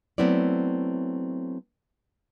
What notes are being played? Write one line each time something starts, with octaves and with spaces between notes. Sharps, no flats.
F#3 A3 B3 C4 E4 D5